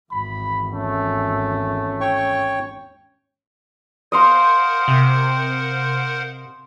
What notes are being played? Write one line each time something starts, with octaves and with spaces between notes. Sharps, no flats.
G#1 E2 B5
A3 C#4
C#5 G5 C#6
A#4 C5 D#5 F5 F#5 C6
C3